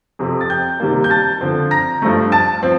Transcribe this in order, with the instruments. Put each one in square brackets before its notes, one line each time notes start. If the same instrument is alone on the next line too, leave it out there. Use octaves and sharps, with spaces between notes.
[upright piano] F2 C3 F3 C4
A6
G5 G6
C3 D#3 G3 A#3
G6
A5 A6
D3 F3 C4
A#5 A#6
G2 F3 A3
A5 A6
F3 C4